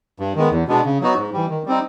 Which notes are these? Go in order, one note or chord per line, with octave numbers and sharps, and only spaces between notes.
G2
D#3 G#3 B3
E2
B2 G#3 B3 D4
C#3
F#3 B3 D#4 F#4
G#2
E3 G3
D#3
G3 C4 D#4